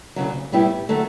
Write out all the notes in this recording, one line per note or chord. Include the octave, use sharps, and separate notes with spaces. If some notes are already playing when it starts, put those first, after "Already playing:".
D2 C#3 F#3
A2 G3 B3 E4 G4
D3 F#3 A3